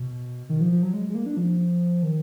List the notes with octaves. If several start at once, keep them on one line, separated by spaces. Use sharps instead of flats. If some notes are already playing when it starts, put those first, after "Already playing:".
Already playing: B2
D#3
F3
F3
F#3
G#3
G#3
A#3
D4
F3
D#3